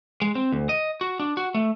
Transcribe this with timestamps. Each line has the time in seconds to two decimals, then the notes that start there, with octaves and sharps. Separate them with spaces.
0.22 G#3
0.35 C4
0.52 D2
0.69 D#5
1.01 F#4
1.20 D4
1.37 F#4
1.54 A3